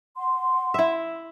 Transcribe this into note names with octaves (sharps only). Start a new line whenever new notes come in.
F#5 C6
E4 E5